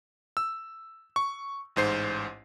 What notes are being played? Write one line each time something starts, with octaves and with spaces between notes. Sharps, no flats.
E6
C#6
A1 G#2 C5 C7